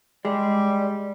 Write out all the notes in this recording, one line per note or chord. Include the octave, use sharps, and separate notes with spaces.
G3 G#3 D5